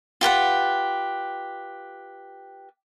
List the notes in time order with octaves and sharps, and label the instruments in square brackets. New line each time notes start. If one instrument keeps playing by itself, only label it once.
[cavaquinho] F4 G4 B4 F#5